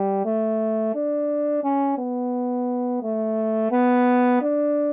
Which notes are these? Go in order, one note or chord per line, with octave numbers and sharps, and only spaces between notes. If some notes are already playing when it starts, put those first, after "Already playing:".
Already playing: G3
A3
D4
C#4
B3
A3
B3
D4